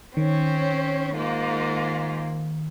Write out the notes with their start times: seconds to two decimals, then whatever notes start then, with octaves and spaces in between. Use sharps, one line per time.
0.17 D#3 C4 C#4 C#5
1.16 G#2 A#3 F4